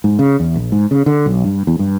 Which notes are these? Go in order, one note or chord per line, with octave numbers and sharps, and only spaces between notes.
G#2
C#3
E2
A#1
G#2
C#3
D3
B1
G2
E2
G2